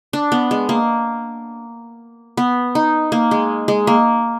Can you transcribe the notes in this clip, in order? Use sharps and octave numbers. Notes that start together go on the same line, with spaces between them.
D4
B3
G#3
A#3
B3
D#4
A#3
G#3
G#3
A#3